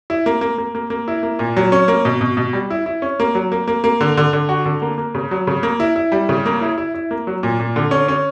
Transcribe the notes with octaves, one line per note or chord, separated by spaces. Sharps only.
E4
A#3
A#3
A#3
A#3
A#3
E4
A#3
A#2
F#3
C#4
A#3
B2
B2
B2
G3
E4
E4
C#4
A#3
F#3
A#3
A#3
A#3
D3
D3
D3
F#4
D3
A#3
A#3
C#3
F#3
C#3
A#3
E4
E4
G3
C#3
A#3
E4
E4
E4
A#3
F#3
A#2
A#2
D3
C#4
C#4